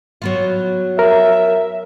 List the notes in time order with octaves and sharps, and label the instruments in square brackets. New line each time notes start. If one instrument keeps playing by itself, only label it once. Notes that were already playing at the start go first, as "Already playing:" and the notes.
[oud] F#3 B3 F4
[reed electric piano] A#4 [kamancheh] E5